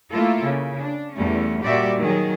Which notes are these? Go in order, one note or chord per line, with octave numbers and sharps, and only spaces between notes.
A3 A#3 E4 F4 A4
C#3
D4
E2 G3 A3 C#4
A#2 G3 F#4 G4 D5 E5
D#3 F#3 G#4